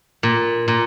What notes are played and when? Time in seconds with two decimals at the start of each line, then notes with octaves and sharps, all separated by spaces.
0.23 A#2
0.68 A#2